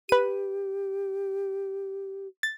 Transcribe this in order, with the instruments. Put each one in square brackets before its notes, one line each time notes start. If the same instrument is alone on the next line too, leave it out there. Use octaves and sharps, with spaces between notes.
[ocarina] G4 [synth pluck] B4 D#7
[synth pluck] A6